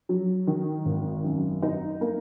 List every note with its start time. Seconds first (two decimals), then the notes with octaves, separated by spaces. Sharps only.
0.09 F#3
0.47 D#3
0.86 G#1
1.24 F#2
1.62 D#4
2.01 A#3